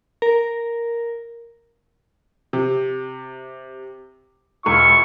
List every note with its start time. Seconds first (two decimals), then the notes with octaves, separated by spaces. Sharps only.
0.22 A#4
2.53 C3
4.66 E1 E4 F4 C#6